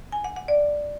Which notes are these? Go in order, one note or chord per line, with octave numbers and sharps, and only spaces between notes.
G#5
F#5
F#5
D5